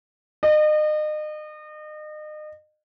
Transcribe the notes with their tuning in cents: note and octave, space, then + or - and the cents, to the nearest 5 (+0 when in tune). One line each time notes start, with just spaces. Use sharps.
D#5 -35